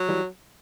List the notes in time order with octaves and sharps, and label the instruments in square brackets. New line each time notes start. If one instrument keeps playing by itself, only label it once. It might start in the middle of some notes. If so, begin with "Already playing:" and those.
Already playing: [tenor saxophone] F#3
[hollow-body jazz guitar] E3 G3